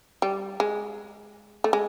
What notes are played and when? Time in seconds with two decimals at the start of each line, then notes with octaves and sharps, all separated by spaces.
0.22 G3
0.60 G#3
1.64 A3
1.73 G#3